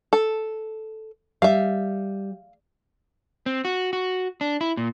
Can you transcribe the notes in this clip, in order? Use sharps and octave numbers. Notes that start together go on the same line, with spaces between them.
A4
G3 E5 F5
C4
F#4
F#4
D4
E4
A#2